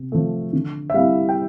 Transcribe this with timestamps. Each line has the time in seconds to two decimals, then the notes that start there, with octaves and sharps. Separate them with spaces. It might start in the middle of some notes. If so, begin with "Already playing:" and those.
Already playing: C3
0.12 F3 A3
0.53 D3
0.90 E5
0.94 G3 C4 E4 F5
1.29 G5